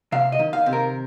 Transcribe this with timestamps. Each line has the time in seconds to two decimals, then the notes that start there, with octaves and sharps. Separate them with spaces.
0.12 C3 F5
0.32 D#5
0.39 D#3
0.53 F5
0.66 C3
0.73 A#4